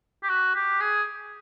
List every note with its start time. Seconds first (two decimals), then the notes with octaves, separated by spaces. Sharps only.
0.23 G4
0.29 F#4
0.55 G4
0.80 G#4